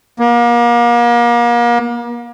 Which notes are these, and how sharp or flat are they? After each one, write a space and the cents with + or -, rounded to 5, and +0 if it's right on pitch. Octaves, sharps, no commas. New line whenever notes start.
A#3 +35